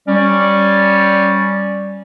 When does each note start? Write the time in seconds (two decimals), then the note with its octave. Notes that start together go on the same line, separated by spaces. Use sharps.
0.07 G3 C#4 D5